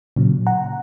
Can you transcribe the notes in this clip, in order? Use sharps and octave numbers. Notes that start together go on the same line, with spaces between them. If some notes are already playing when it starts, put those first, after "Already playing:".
A#2 C#3 F#3
F#5 A#5